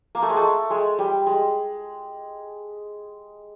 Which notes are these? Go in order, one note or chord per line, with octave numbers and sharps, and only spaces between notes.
A#3
A3
G#3
A3
G#3
G3
G#3